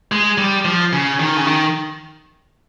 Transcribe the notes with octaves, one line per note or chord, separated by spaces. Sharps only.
G#3
G3
F3
C#3
D#3
C#3
D#3